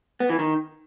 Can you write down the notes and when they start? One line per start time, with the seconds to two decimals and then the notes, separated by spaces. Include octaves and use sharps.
0.20 B3
0.30 E3
0.39 D#3